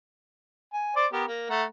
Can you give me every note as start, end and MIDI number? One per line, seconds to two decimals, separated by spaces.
0.73 0.92 80
0.96 1.06 72
0.96 1.06 74
0.96 1.06 86
1.13 1.24 59
1.13 1.24 67
1.13 1.24 70
1.28 1.46 58
1.50 1.64 57
1.50 1.64 78
1.50 1.64 82